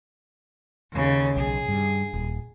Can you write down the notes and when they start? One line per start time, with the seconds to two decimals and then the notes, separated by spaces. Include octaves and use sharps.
0.93 D#2 C#3
1.36 B1 G#4
1.68 G2
2.14 D#1